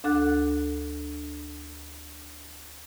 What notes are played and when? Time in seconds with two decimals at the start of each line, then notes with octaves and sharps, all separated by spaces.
0.04 D2 D4 A4 F#5 F#6